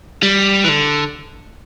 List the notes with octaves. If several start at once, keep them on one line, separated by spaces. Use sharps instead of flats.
G3
E3
D3